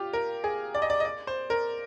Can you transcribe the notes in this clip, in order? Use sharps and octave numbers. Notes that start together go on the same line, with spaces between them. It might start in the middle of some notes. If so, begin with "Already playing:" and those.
Already playing: F4 G4
A#4
G#4
D5
D#5
D5
D#5
D5
C5
A#4